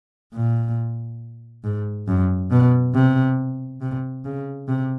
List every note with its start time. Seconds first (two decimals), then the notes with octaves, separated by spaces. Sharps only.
0.34 A#2
1.64 G#2
2.08 F#2
2.51 B2
2.94 C3
3.81 C3
4.25 C#3
4.69 C3